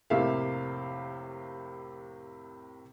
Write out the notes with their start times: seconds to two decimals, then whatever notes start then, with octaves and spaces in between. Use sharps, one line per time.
0.10 F1 A2 C3 A#3 E5 F5